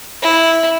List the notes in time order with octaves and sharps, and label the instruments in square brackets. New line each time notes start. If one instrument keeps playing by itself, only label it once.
[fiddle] E4